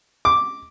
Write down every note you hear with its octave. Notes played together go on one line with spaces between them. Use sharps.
D6